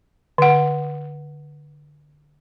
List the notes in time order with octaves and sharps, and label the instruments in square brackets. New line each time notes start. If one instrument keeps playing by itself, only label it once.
[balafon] D3 F#5